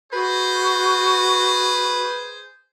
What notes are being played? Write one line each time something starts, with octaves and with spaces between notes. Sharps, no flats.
F#4 G#4 B4 C5